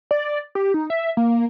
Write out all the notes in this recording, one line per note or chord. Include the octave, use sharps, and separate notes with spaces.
D5
G4
D#4
E5
A#3